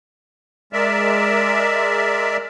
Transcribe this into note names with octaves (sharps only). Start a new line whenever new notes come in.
G#3 A#4 D5 E5